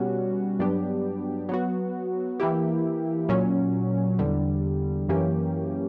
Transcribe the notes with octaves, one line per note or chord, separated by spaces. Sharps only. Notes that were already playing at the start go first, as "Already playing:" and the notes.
Already playing: B2 G3 C#4 F#4
G2 F#3 B3 D4 G4
F#3 B3 F#4
E3 A#3 E4 G4
A#2 F#3 C#4
E2 D3 G3
F#2 E3 A#3 C#4 G4